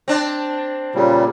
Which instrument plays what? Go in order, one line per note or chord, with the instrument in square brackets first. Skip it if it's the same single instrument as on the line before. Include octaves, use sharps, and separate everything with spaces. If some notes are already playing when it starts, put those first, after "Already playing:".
[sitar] C4 D4
[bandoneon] A#2 C#3 G3